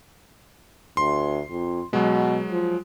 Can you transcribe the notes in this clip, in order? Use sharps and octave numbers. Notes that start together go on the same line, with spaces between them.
D2 C6
F2
B2 F#3 G#3
F3